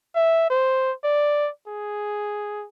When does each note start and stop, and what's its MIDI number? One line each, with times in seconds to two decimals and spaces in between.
0.15 0.48 76
0.50 0.92 72
1.04 1.49 74
1.68 2.65 68